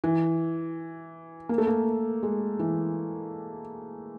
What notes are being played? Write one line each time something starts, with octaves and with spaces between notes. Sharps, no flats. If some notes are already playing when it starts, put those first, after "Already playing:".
E3
A#3
A3
A#3
G#3
E3